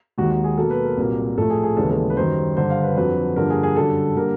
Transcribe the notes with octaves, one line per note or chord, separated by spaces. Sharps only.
D#2 D#3 G#3 F#4
F#4
G#4
B2 F#3 A#3 A4
B4
A#4
C2 A#2 F#3 A#3
A2 F3 A3 A4
G#4
G#4
D#2 C#3 E3 G#3 B3 A4
A4
B4
F#2 D#3 G3 C5
G2 D3 G3 C5
F5
B4
F2 D3 F#3 B4
G2 D3 F3 A#3 A#4
G#4
G#4
F#2 D3 G3 A4
D3 G3 A#3 A#4